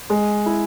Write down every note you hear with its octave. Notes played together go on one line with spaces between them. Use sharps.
G#3
E4